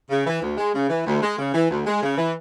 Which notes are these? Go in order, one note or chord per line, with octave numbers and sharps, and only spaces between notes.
C#3
E3
D2
G#3
C#3
E3
D2
G#3
C#3
E3
D2
G#3
C#3
E3